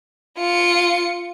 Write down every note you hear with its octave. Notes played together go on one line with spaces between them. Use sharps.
F4 C#7